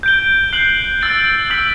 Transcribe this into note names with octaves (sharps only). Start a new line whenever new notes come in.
G6 D7 G7
F#6 C7 F#7
E6 A6 D7
E6 B6 F#7